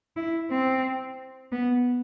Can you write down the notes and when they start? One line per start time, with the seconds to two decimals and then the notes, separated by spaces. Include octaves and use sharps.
0.16 E4
0.51 C4
1.52 B3